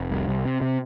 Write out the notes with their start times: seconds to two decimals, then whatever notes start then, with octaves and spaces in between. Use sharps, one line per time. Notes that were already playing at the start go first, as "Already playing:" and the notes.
Already playing: F1
0.11 C2
0.28 C2
0.45 C3
0.61 C3